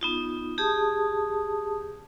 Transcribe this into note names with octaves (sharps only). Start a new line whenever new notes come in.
B3 D#4 F4
G4 G#4 A5 D#6